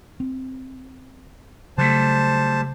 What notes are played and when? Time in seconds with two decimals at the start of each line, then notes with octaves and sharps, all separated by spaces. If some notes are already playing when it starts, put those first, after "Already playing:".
0.20 C4
1.78 C#3 F#3 G3 A3 C5 A5